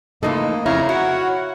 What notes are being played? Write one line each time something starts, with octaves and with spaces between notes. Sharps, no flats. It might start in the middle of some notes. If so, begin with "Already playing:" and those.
C#3 E3 F3 A3 A#3 D#4 A4 D#5
F2 C#3 E4 C#5 F5 A#5
E4 F#4 C#5 F#5